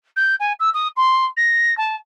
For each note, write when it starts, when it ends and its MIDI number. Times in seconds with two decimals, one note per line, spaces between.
0.16 0.35 91
0.40 0.53 80
0.60 0.70 88
0.74 0.88 87
0.97 1.26 84
1.37 1.77 94
1.78 1.96 81